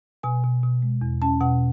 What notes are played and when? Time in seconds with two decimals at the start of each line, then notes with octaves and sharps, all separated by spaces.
0.23 B2 G#5
0.44 B2
0.64 B2
0.82 G#3
1.01 E2
1.22 C#4 A5
1.41 B2 F#5